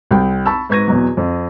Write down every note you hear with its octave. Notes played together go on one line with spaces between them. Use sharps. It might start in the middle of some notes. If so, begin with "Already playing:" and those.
C2 G5
A5 B5 C#6 E6
G#2 B4 C#6 G#6 A#6 D#7
E2 B2 F#3
F2